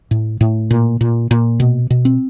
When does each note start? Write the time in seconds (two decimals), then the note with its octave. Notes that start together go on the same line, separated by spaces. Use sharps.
0.11 A2
0.41 A2
0.71 A#2
1.01 A#2
1.31 A#2
1.60 B2
1.90 B2
2.05 C4